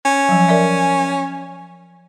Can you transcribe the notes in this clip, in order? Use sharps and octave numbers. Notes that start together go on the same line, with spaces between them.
C#4
F3 F#3
A#4 D5 E5